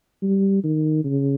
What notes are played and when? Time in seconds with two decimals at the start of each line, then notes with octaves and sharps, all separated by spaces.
0.22 G3
0.64 D#3
1.04 C#3